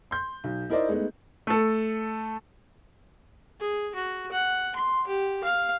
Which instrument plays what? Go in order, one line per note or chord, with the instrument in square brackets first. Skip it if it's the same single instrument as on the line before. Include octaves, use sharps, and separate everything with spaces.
[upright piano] C6 G6
B1
D#4 E4 A#4 C5 D5 D#5
G#3 A3 B3 D#4
[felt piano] A3 A4
[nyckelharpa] G#4
F#4
F#5
C6
G4
F5